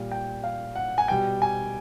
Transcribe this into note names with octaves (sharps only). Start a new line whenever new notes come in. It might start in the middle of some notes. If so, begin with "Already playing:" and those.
Already playing: A#2 G3 F5
G5
F5
F#5
G#5
B2 G3 G5
G#5